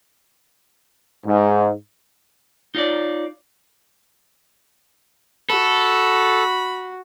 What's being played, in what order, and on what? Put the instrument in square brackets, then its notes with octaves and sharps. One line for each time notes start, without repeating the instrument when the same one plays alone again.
[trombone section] G#2
[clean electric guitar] D#4 F4 C#5 D5
[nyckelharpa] F#4 [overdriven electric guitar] A4 [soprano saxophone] B5